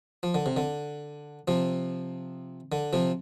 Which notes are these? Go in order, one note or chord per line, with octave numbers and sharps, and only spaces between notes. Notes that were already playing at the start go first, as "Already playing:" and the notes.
F3
D3
C3
D3
C3 F3
D3
C3 F3